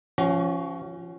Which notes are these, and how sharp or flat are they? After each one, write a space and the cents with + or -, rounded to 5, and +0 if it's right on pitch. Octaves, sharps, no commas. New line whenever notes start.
F3 -20 C#4 +0 F#4 +35